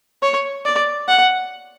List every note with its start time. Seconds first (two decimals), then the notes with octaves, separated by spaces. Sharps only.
0.22 C#5
0.65 D5
1.08 F#5